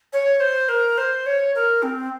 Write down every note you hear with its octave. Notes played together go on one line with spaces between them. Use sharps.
C#5
C5
A#4
C5
C#5
A#4
C4